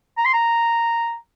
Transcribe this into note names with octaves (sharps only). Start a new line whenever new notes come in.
A#5
C6
A#5